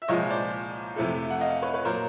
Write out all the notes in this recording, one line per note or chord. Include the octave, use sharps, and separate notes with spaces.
E5
C2 A#2 F3 G#3 C#5 D#5
C5 D5
F2 C3 E3 A3
F#5
D#5 F5
B4 C#5
B4 C#5
A#2 F#3 A#3 A#4 C5